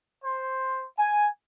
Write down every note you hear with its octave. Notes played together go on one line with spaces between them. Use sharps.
C5
G#5